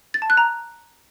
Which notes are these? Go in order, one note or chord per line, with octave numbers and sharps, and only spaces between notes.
A6
A5
F#6
A#5